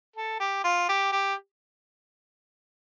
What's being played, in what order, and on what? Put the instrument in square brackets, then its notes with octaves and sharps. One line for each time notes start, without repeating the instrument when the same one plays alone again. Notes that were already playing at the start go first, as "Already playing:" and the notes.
[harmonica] A4
G4
F4
G4
G4